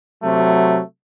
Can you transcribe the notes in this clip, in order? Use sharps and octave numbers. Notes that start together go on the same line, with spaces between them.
C3 F#3 A3